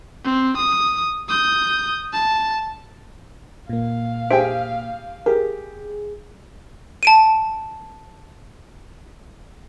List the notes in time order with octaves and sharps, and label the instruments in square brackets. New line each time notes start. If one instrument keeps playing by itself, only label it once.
[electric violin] C4
D#6
D#6 G6
A5
[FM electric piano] A#2 A#3 [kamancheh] F5
[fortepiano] G4 G#4 G5 [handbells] C5 E5 D7
[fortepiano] G4 [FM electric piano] G#4 [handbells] A#4
[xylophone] A5 D7 D#7